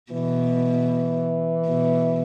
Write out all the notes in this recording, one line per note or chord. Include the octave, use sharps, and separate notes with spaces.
B2 E3
B2